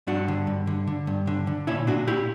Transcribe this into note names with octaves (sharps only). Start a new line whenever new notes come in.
G2 D4 F#4
D3
G2
D3
D3
G2
D3
D3
A#2 C#4 E4
A#2 D4 F#4
A#2 E4 G4